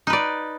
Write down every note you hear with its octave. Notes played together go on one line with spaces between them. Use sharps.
D#4 B4 D5